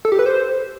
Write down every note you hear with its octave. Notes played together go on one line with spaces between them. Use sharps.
A4
G4
B4
C5